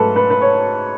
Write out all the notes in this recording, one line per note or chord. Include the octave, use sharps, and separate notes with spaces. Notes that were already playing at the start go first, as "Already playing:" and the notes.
Already playing: G#2 F#3 A3 A4 B4
B4
B4
C#5